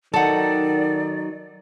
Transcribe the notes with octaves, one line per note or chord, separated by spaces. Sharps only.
D#3 F#3 D#4 A4 D5 F#5